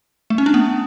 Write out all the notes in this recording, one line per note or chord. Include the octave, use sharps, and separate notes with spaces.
A3
C#4
D4
B3